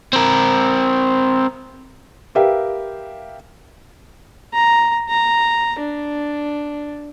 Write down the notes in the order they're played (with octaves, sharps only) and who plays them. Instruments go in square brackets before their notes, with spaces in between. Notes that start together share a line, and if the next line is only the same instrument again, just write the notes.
[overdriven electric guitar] C4 A#4
[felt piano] G4 A#4 B4 E5 F5 G5
[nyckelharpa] A#5
A#5
D4